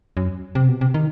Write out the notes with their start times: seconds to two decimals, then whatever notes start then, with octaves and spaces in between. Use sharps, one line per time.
0.17 F#2
0.55 C3
0.68 B2
0.81 C3
0.94 D#3